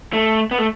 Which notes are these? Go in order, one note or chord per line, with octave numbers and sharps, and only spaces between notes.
A3
B3
A3